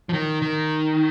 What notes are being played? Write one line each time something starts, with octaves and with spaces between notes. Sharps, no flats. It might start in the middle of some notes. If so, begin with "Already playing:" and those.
F3
D#3
D#3